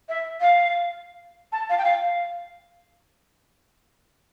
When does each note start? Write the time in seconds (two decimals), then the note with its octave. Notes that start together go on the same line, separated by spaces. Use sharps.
0.09 E5
0.41 F5
1.52 A5
1.70 F5
1.78 G5
1.84 F5
2.02 F5